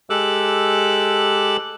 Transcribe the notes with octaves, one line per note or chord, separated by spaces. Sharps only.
G#3 G4 A4 D6 E6 F#6